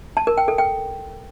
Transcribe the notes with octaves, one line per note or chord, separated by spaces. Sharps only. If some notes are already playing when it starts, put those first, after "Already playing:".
A5
A#4
G5
A4
G5